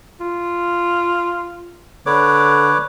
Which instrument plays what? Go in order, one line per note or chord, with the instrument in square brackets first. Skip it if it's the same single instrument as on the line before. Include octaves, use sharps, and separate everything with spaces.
[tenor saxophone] F4
[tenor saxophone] D3 [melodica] B4 C#5 D6